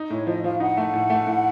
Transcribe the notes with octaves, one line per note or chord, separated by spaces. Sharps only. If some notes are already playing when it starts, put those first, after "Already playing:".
Already playing: D#4
A2 C#5
F3 D#5
F3 F5
D#4 F#5
A3
A2
A3
A2